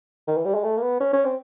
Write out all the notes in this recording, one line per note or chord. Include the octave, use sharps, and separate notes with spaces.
D#3
E3
G3
G#3
A3
A#3
B3
C#4
C#4
C4